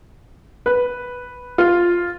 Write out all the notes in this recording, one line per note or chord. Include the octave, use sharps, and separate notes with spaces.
B4
F4